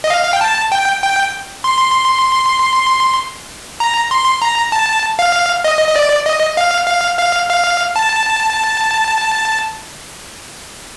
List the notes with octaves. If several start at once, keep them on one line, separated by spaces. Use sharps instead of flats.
D#5
F5
F5
G5
A5
G5
G5
C6
A#5
C6
A#5
A5
F5
D#5
D#5
D5
D#5
F5
F5
F5
F5
A5